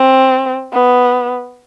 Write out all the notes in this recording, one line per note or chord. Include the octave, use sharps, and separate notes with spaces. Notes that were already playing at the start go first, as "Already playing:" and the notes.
Already playing: C4
B3